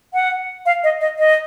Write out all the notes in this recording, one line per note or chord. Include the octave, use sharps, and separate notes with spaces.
F#5
F5
D#5
D#5
D#5